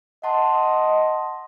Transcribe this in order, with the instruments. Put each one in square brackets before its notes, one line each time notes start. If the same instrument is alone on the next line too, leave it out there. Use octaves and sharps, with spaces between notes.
[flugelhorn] D#5 [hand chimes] F#5 A5 C6